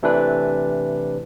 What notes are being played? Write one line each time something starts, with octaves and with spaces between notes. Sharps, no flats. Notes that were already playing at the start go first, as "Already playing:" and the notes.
C3 E3 A3 D4 B4